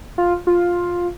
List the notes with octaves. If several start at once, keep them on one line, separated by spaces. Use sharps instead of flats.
F4
F4